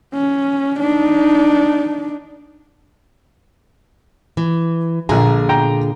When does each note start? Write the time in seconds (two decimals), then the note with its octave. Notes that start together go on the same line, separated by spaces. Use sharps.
0.14 C#4
0.80 D4 D#4
4.37 E3
5.09 A#1 A#2 D3 G#4 A#5
5.49 G5 A#5